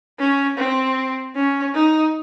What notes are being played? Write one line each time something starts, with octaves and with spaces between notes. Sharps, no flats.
C#4
C4
C#4
D#4